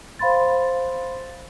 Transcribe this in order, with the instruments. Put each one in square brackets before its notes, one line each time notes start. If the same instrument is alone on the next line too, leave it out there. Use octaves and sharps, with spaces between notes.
[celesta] C5 F5 B5 C6 A6